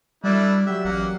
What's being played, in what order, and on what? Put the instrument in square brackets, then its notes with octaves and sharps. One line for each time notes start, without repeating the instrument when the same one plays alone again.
[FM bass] G3 [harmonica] A3 D4 E4 [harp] F#4 D5
[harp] F#3 G4 [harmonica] E5
[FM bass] A1 [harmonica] A#3 F#5